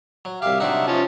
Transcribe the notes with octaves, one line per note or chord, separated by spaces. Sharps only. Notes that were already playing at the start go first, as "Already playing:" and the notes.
F#3
C2 G4 E5 F5
C3 F#3 D4 D#4 E5 F#5
F3 C#4 A5